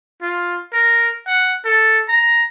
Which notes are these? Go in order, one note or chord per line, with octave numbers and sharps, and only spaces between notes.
F4
A#4
F#5
A4
A#5